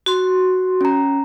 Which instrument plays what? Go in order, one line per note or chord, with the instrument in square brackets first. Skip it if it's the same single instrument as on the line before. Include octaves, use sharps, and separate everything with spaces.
[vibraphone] F#4 C6
[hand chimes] C#4 A#5